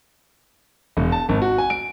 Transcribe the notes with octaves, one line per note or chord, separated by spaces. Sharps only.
E1
A5
G#1
F#4
G#5
D7